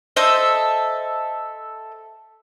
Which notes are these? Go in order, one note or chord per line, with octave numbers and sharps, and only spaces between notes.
A4 C5 D#5 E5